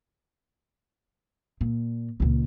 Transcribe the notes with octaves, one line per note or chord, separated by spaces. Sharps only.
A#2
C#2 A#2